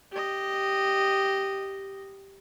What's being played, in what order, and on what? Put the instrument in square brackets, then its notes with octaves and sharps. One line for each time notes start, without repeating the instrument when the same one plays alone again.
[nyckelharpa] G4 D#5